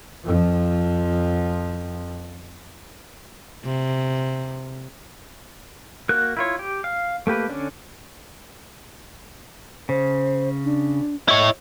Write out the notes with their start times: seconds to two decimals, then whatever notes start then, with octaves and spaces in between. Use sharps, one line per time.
0.24 F2 F3
3.64 C3
6.09 A#3 F#4 A#4 F#6
6.37 E4 F4 C#5
6.59 G4
6.84 F5
7.27 A3 A#3 G4 B4
7.49 D3 C#4 D4
9.89 C#3 C5
10.65 D4
11.28 E4 C#5 D#5